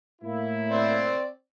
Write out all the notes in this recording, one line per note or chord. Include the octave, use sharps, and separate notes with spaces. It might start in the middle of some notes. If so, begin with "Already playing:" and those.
A2 A#3 E4
C4 C5 D5